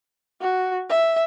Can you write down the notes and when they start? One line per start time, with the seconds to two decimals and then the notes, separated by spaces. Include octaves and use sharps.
0.41 F#4
0.90 E5